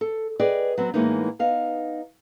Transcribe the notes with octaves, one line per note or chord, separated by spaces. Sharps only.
A4
G#4 B4 D5 D#5 G5
F#3 B3 C4
A2 E3 G#3 A#3 B3 D#4
B3 D#4 F5